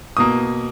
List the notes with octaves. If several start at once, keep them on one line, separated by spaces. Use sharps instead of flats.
B2 A#3 D#6